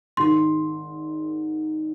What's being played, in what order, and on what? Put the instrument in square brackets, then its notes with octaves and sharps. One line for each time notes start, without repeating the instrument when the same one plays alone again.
[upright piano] G#1 G#2 D#3 [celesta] C6